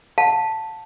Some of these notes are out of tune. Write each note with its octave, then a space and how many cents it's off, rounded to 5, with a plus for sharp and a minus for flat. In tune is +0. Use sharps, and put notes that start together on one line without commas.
F#5 -45 A5 +5